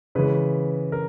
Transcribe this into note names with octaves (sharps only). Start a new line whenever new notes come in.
C#3 E3 G#3 B4
A#4